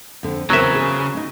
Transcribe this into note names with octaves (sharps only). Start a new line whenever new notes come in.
F2 D3
E2 C#3 F#3 C4 A#4 E5
G#4
D#4